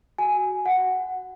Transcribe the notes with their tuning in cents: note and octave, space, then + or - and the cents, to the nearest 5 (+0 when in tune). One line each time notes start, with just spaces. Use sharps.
F#4 +10 G#5 +0
F#4 +0 F#5 +0